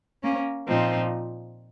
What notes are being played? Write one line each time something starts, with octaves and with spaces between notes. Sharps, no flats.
A#3 C#4
A#2 F3 C4 D#4